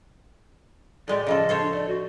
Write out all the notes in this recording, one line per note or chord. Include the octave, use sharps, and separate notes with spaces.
A2 G#3 G4 D5
C#3 F3 A4 D#5
A4 C5 C#5
D4
A3 D5
F#4